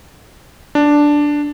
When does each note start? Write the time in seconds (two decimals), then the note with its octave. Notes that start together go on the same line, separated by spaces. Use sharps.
0.75 D4